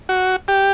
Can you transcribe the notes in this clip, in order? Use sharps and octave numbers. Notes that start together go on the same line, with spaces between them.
F#4
G4